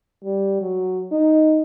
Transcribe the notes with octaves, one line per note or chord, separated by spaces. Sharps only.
G3
F#3
D#4